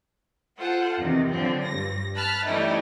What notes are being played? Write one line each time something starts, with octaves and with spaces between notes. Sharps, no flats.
F4 A4 C5 F#5
E2 C3 D#3
D3 F3 F#3 C4
G2 A#6
A5 B5 F6 F#6 A6
E3 G3 A3 C#4 D#4 E4